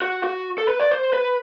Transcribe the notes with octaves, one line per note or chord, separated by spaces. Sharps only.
F#4
F#4
A4
B4
D5
C5
B4